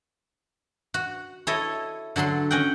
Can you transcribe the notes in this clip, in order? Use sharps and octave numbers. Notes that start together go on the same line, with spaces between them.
F#4
E4 A4 C#5 D#5
D3 F#3 A4 C6
C#4 D#5 F#5 G5